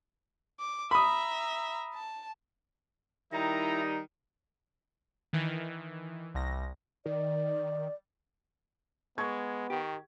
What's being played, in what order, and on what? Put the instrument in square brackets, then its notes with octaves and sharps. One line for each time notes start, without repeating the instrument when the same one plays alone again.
[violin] D6
[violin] E5 A#5 [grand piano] B5 D#6
[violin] A5
[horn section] D#3 G3 D#4 [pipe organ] E4 A#5
[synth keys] D#3 E3
C2 A#6
[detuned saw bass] D#3 [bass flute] D5
[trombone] G#3 [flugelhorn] B3 [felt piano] C#6 G#6
[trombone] D#3 [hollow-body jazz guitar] G4